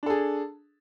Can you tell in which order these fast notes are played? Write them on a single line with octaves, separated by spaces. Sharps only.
D4 A4 G#4